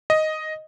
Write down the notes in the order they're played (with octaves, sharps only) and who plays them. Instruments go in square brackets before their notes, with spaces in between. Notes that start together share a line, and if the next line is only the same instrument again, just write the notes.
[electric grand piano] D#5